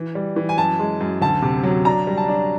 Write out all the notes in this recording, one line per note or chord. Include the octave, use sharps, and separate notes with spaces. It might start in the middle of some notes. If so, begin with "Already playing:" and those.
Already playing: E3
G3
E3
G#5
F#2 A5
G#3
F#2
D2 A5
C3
F#3
D4 A#5
G3
A5
D4